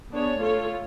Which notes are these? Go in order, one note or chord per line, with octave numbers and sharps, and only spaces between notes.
B3 D4 G#4 C#5
A3 F4 A4 C#5